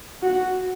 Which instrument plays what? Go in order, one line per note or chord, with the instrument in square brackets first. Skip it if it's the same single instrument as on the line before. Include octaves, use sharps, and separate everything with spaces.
[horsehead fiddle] F#4